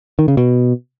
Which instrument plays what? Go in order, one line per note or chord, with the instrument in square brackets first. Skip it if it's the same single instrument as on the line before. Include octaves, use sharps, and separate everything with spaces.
[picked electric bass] D#3
C#3
B2